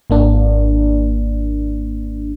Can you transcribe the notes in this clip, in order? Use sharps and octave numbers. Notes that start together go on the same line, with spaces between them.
G#1 A#3 D4